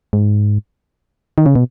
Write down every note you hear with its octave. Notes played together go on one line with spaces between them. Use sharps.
G#2
D#3
C#3
B2